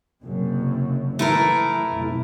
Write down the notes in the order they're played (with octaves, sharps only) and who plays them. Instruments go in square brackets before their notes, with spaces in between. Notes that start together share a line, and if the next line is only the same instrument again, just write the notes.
[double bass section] F#1 F#2 C3
[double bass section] E3 [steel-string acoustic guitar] A3 E4 A#4
[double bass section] F1 B1